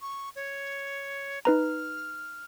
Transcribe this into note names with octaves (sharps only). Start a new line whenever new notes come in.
C#6
C#5
D#4 B4 A#5 F6